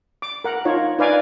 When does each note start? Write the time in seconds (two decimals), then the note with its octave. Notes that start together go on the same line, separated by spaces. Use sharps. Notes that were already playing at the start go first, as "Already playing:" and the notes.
0.22 D6
0.44 A#4 F#5
0.65 D#4 F4 C#5
0.99 D#4 B4 D5 F5 G#5 D6